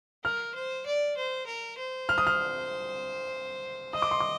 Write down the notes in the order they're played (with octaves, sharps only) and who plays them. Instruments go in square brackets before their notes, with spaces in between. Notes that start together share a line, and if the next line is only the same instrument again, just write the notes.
[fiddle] A#4 [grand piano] F6
[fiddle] C5
D5
C5
A#4
C5
[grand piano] F6
D#6
F6
[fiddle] D#5 [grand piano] D#6
[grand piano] D6
C6
D6